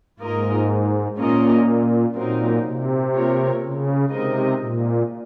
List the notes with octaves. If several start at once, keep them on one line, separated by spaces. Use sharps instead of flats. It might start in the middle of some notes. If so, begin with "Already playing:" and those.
G#2 A#3 F4 A#4 D#5
A#2 A#3 C#4 F4 A#4 D#5
A#2 F#3 C4 D#4 A#4
C3
A#3 F4 A#4 C#5
C#3
C3 G#3 C4 D#4 A#4 D#5
A#2